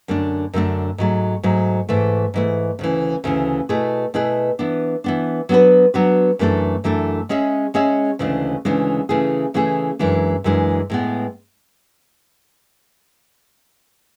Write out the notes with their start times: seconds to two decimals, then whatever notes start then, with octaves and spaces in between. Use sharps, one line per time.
0.08 F#2 D3 A3 D4
0.53 F#2 D3 A3 D4
0.98 G#2 F#3 A3
1.43 G#2 F#3 A3
1.89 G#2 E3 A3
2.34 G#2 E3 A3
2.79 D2 C#3 E3
3.24 D2 C#3 E3
3.69 B2 A3 E4 G#4 B4
4.14 B2 A3 E4 G#4 B4
4.59 E3 B3 D4
5.04 E3 B3 D4
5.49 F#3 B3 D4 F#4 B4
5.94 F#3 B3 D4 F#4 B4
6.39 F#2 E3 A3 D4 A4
6.84 F#2 E3 A3 D4 A4
7.29 G#3 C#4 G#4 C#5 E5
7.74 G#3 C#4 G#4 C#5 E5
8.19 D2 C#3 E3 G#3 D4
8.65 D2 C#3 E3 G#3 D4
9.09 C#3 E3 A3 E4 G#4
9.54 C#3 E3 A3 E4 G#4
9.99 F#2 E3 G#3 D4
10.44 F#2 E3 G#3 D4
10.90 A2 G#3 B3